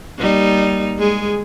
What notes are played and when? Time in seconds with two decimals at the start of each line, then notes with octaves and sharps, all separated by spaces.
0.18 G3 A#3 D#4
1.00 G#3 G#4